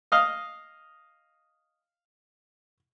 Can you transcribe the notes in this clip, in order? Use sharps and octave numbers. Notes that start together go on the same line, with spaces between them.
D#5 F5